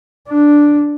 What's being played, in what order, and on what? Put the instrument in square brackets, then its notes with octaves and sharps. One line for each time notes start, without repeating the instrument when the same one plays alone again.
[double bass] D4